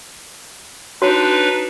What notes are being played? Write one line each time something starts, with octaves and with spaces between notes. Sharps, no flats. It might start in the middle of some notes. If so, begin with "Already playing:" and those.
D4 D#4 F#4 B4 C#5